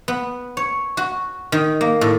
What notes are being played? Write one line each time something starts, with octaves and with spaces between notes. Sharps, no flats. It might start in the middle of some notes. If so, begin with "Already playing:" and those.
B3
C#5
F#4
D#3
A#3
A2